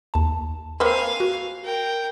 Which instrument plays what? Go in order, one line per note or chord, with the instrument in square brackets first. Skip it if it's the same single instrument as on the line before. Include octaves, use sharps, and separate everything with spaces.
[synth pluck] D#2 A5
[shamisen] A#3 C4 B4 [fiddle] F5 G#5 [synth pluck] E6
[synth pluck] F#4
[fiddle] A#4 G5